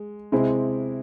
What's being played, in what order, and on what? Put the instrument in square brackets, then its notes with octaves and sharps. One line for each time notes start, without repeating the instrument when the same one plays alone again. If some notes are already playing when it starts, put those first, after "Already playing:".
Already playing: [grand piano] G#3
C3 G#3 C4 E4